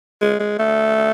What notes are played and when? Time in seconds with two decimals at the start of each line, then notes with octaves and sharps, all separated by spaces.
0.21 G#3
0.40 G#3
0.59 A3